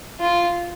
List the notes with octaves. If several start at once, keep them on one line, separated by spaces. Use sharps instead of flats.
F4